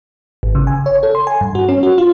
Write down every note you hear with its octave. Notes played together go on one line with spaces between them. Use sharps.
G#1
C#3
G#5
C#5
A4
C6
G#5
G2
F#4
C#4
F#4
F4